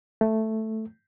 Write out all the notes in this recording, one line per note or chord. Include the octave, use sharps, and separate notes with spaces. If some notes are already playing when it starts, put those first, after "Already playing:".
A3